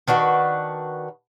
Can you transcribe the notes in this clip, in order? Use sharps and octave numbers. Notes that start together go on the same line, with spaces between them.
D#3 D4 F#4 B4